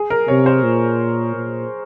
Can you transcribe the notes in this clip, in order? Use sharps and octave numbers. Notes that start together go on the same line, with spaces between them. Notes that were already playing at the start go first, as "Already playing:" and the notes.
Already playing: G#4
A#4
C3 C#5
C5
A#2
A#2